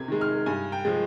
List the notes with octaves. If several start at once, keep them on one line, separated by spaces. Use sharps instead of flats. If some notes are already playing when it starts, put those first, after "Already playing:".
Already playing: C3 G#6
D#3 G#3
F6
G2 G#5
G5
F3 G#3